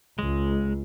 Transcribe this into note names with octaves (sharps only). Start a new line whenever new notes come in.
C#2 G#3